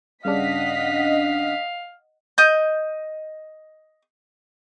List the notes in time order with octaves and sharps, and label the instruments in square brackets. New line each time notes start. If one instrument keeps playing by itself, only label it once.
[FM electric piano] G2 C#3 D4 [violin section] D#5 F#5 B6 [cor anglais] F5
[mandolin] D#5 G6